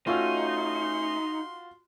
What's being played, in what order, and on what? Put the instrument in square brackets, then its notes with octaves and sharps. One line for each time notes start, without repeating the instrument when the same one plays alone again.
[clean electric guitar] A3 C#4 [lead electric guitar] D#4 [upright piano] F4 F#4 [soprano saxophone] C6